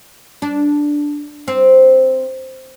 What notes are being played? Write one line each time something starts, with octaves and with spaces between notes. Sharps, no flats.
D4
C4